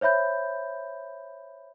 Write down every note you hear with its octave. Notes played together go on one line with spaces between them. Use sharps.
C5 C#5 E5 B5 G6